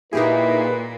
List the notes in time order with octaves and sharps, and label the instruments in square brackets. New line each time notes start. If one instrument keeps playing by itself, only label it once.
[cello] A#2 A#3 [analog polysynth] D#4 G4 G#4 [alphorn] E4 [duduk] B4